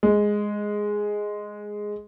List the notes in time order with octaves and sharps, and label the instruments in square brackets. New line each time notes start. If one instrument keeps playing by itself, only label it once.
[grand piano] G#3